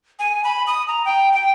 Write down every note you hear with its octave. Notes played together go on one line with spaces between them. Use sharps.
G#5
B5
D#6
A#5
G5
G5